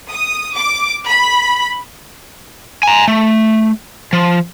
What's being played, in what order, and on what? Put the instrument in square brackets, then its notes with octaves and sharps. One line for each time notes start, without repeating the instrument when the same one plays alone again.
[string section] D#6
D6
B5
[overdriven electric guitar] G#5 A#5
A3
F3